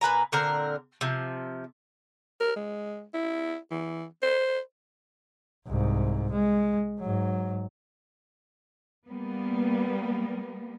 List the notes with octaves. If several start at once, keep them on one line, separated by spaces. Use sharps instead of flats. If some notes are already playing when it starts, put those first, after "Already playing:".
A#2 B4 G#5 A#5
A#2 D3 C4 A#4
C3 F3
A#4
G#3
E4
E3
C5
C2 G#2
G#3
G#2 F#3
G3 A#3 B3